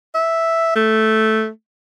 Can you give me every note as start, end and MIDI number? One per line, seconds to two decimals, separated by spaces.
0.15 0.75 76
0.75 1.48 57